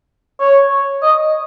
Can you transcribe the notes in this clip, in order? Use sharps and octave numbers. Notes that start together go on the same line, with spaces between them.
C#5
D#5